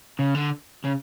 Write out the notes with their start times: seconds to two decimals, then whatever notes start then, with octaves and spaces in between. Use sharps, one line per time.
0.19 C#3
0.35 D3
0.84 C#3